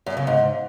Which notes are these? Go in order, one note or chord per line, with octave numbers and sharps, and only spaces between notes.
F#2
C#3
G#2